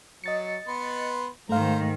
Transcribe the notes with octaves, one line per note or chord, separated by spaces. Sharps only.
F#3 D#5 A6 C#7
B3 B4 C6
G#2 D#3 A3 C5 F5 A#5